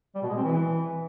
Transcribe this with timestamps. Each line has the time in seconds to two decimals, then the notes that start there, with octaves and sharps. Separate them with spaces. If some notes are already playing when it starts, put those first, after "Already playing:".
0.15 G3
0.22 B2
0.29 G#3
0.36 C4
0.44 E3